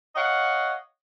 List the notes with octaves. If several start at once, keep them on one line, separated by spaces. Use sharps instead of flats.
C#5 D#5 F5 F#5